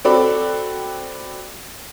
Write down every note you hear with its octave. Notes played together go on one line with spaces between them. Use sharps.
C4 F#4 A4 D5 B5